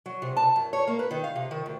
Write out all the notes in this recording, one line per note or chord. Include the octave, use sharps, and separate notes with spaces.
F#3
C3
A5
F#2
C#5
A#3
B4
D#3
F5
C3
D#3
D2